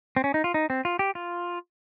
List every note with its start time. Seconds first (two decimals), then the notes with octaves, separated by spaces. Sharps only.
0.16 C4
0.24 C#4
0.34 D#4
0.44 F4
0.54 D#4
0.70 C4
0.85 F4
0.99 G4
1.15 F4